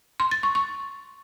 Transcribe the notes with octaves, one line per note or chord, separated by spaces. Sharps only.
C6
A6
C#6
C#6